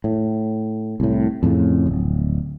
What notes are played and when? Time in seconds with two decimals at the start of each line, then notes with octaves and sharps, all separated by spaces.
0.04 A2
1.00 C2 A2
1.43 F2 A2 C#3
1.86 D1